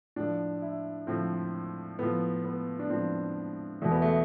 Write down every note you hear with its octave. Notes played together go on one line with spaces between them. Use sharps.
A2 F3 D4
E4
A2 F3 C4
A2 F3 B3
B3
D4
A2 F3 C4
E2 B2 A3
B3
A3